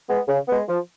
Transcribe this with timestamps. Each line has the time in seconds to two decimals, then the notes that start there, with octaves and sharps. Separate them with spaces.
0.09 G#3 B3
0.28 C#3
0.48 G#3 B3
0.67 F3